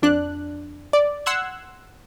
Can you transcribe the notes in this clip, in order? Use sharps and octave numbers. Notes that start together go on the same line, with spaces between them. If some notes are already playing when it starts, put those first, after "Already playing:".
F2 D4 F#6
D5
F#5 C6 E6 F#6 G#6